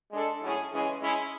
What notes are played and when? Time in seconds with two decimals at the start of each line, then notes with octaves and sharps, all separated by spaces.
0.11 G#3 D4 A4
0.42 A2 F#3 C#4 E4 G#4
0.72 C#3 E3 G#3 C#4 G#4
1.01 G#3 C#4 E4 G#4